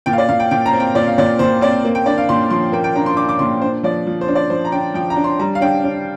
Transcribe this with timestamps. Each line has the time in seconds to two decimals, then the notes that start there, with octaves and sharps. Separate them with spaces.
0.06 A#2 G5
0.13 F5
0.18 D5
0.29 A#2 F5
0.40 G5
0.51 A#2 G5
0.66 A#5
0.73 C4
0.80 G5
0.95 A#2 D5
1.07 F5
1.18 A#2 D5
1.39 A#2 C5
1.61 C4 D5
1.85 A#3
1.95 G5
2.06 D4 D5
2.18 F5
2.29 A#2 C6
2.50 F3 C6
2.72 A#3 G5
2.84 G5
2.95 D4 A#5
3.06 C6
3.17 D4 D6
3.29 D6
3.39 A#2 C6
3.61 D4 C5
3.83 F3 D5
4.07 F3
4.21 C5
4.28 D4
4.35 D5
4.50 F3 C5
4.65 A#5
4.72 D4 G5
4.94 F3 G5
5.10 A#5
5.16 D4
5.24 C6
5.39 G3 A#5
5.55 F5
5.61 D4 G5
5.84 D4